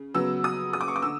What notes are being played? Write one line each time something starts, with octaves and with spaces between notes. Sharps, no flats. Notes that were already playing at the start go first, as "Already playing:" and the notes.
Already playing: C#3
C#3 F#3 B3 E6
D#6
D#6
D6
C#6
D6
D3 E6